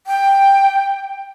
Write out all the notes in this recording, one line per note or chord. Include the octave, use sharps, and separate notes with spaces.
G5